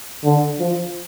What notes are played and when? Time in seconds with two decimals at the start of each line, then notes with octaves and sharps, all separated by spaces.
0.24 D3
0.59 F3